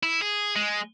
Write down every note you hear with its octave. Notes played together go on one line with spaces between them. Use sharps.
E4
G#4
G#3